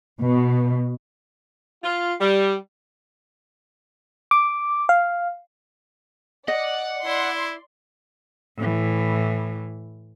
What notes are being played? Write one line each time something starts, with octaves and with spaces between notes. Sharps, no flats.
B2
F4
G3
D6
F5
D5 D#5 F#5
E4 D5 C6
A2 E3